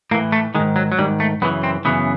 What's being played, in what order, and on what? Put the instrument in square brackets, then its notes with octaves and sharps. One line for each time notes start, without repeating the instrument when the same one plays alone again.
[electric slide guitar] A2 A#3
E3
A3
D#3 G#3
G#2
F#3
F#3
G#2 D#3 G3
A3
F#2 C#3 E3 B3
C4
F#2 C#3 E3 B3